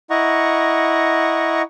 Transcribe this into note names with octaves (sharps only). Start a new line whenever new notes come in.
E4 D#5 F#5 A#5 C#6